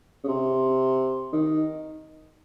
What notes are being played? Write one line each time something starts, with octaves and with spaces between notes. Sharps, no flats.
C#3
C3
D#3